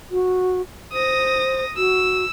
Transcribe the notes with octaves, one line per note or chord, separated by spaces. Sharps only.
F#4
C5 D#6 A#6
F#4 E6